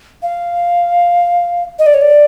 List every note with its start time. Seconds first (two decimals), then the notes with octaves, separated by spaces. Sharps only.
0.22 F5
1.79 D#5
1.86 D5
1.94 C#5
2.02 D5